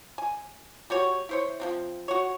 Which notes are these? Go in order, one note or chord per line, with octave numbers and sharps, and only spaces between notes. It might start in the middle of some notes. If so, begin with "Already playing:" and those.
G#5
G3 F#4 C#5 C#6
E4 C5 C#5
F3 F#3 C4
F#4 C#5